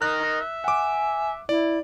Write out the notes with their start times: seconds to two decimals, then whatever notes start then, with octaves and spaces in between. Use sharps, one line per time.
0.02 D#4 A#4 D#5 F#6
0.40 E5
0.64 F#5 G#5 D6
1.49 E4 D5